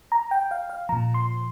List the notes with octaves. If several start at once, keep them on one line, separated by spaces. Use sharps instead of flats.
A#5
G5
F5
F5
A#2 F3 A#5
C6